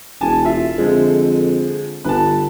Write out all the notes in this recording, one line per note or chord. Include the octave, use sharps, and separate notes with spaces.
E1 G#5 A5
F4 E5
F2 D3 F3 G#3
G1 B4 A5